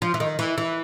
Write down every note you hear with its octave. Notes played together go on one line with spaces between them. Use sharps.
F3
E3
D#3
E3
E3